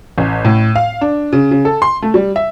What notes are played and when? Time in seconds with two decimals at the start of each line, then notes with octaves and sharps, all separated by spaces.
0.18 A1
0.45 A2
0.76 F5
1.01 D4
1.33 C#3
1.51 C#3
1.65 A4
1.82 C6
2.02 A3
2.14 G3
2.36 E5